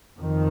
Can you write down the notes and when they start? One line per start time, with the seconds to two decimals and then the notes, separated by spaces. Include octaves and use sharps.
0.19 F2 D#3